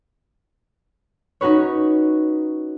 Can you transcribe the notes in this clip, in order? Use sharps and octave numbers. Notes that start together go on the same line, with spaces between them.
C#4 D#4 F#4 B4 C#5